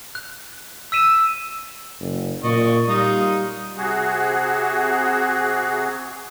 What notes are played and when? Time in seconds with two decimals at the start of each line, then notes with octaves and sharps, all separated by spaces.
0.15 F#6
0.92 E6 B6 D#7 E7
2.00 F#1
2.44 A#2 D5 D#5 C#6
2.88 G3 D#4 F4 D#6
3.78 C3 F#4 G#4